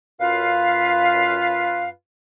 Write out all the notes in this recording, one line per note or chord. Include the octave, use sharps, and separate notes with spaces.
F#2 F4 B4 F5